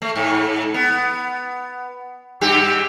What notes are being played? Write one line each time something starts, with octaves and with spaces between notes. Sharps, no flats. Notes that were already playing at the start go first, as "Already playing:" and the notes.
A3
G#2
B3
G2 G4